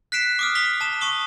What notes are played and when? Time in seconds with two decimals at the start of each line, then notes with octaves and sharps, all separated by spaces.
0.12 F#6 B6 C7 D7 E7
0.39 D6 D#6 F6
0.55 B6 F7 G7
0.81 A5 E7
1.01 A5 C#6 D#6 G7